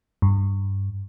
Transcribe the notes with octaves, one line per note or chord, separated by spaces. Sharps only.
G2